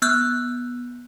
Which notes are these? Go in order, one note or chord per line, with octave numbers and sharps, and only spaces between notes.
B3 E6 F#6 G6